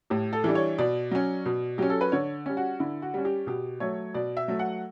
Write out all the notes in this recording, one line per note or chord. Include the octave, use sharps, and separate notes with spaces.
A2 G4
A4
E3 G3 D4
C#5
B2 D5
F#3 C#4
B2
F#3 C#4 G4
A4
B4
D3 C#5
G3 C#4
F#4
D3 E4
F#4
G3 C#4
G4
B2 G4
F#3 A3 C#5
B2 D5
E5
F#3 A3
F#5